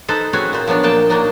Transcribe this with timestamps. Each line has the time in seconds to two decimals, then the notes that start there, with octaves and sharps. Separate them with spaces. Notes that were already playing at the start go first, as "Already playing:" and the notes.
0.08 D#4 A4 B4 C5 A5
0.33 C4 C#4 F#4 G#4 B4 C#5
0.53 A#2 C5
0.67 F3 F#3 B3 D4
0.83 A#2 F3 A#3 G5 A5
1.10 A#2 F#3 A#3 D4 D#4 D#5